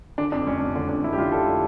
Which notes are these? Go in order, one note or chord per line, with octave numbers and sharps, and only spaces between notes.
D3 D4
F2 D4
F1 C#4
F1 C#4
D3 D4
F2 D4
F1 E4
G4
F1 F4
D3 A4